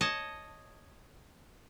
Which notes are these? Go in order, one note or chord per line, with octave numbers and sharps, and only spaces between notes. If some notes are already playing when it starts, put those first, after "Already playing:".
C#5 D#5 A5